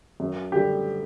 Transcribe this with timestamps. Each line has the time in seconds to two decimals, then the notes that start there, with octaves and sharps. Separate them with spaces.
0.20 F#2
0.52 D3 G3 G4